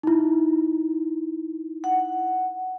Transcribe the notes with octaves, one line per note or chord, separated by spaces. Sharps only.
D#4 E4
F#5